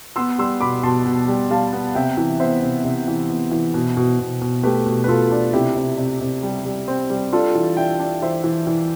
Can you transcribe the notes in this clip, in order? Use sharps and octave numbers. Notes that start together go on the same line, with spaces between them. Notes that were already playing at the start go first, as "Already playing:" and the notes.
B3 C6 E6
G3 C6 E6
B2 B5 D6
B2 A5 C6
B2
G3
G3 F5 A5
B3
C3 E5 G5
E3
B3 C5 E5
C3
C3
E3
B3
E3
B2
B2
B2
B2
A3 G4 B4
B2
B4
B2 F4 A4
D4
C3 E4 G4
C3
C3
C3
G3
G3
C4
G3
D4 F4 A4
E3
D4 E5 G5
D4
E3 C5 E5
E3
E3